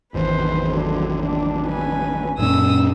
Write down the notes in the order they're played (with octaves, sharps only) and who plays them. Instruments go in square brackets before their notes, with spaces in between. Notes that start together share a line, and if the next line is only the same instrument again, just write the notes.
[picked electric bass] G#1 E2 [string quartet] B4 C5
[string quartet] D3 F#3
D4
C#4 B4 G#5
[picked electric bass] F#2 A#2 C#4 [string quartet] D#6 E6